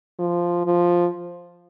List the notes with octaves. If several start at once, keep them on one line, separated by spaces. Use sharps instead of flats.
F3
F3